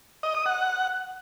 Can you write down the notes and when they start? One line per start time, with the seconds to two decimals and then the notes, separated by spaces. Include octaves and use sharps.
0.23 D#5
0.35 D#6
0.46 F#5